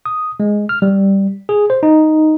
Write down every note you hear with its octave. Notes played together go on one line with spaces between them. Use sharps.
D#6
G#3
F6
G3
G#4
C5
D#4